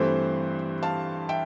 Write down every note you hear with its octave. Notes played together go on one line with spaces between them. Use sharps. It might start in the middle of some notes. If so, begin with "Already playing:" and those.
Already playing: G2 E3 A3 C4 C5
F5 A5
E5 G5